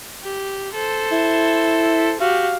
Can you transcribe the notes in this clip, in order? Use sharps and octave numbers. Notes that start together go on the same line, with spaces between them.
G4
A4 C5
E4
F#4 G4 F5